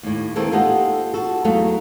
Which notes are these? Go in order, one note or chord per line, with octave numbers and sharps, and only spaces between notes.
D#2 A2
D#2 D#3 E3 A#3 C4 A4
F4 G4 A4 D#5 F#5
F#4 A4
E2 F#3 A3 D#4 A4 F5